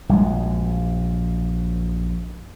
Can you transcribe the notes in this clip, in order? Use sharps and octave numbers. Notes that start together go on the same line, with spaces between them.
A#1 F#2 G3 G#3